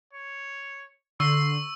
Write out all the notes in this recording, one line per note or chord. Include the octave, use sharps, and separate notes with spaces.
C#5
D3 C6 C#6 E6